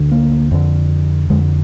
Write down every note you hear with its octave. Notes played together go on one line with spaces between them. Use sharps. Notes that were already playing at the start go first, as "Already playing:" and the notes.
Already playing: D2 D3
A#3
F2 D3
F2 D3 G#3